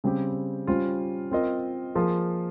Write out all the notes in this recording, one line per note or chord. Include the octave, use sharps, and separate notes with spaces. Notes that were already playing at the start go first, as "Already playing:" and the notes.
C#3 G3 C4 G4
G3 C#4 F4 C5
C4 F4 A#4 D#5
F3 A#3 F4 G#4